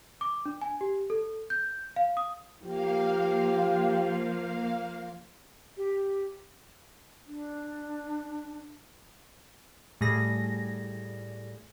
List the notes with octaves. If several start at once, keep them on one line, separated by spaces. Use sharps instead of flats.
D6
D4
G#5
G4
A4
G6
F5
D#6
F3 A#3 G4 F5
G4
D4
A2 G3 A3 G#4 A#6